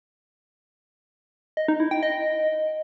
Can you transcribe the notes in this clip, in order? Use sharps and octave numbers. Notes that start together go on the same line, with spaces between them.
D#5
D#4
E4
G5
D#5